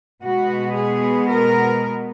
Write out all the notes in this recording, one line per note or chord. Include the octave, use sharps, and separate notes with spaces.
B2 G#3 B3 F#4
G#4
A#4